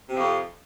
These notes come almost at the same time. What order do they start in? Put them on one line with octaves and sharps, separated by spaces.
C3 F3 F2